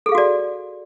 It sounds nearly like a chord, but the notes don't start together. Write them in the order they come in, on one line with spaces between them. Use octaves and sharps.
A4 G#4 F5 F#4 D5